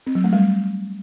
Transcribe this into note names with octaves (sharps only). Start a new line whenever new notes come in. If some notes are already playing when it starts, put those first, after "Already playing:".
C4
F#3
A3
G3